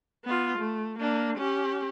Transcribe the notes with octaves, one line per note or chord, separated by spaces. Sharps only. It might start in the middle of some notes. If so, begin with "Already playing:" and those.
B3 F4
A3
A#3 D4
C#4 G4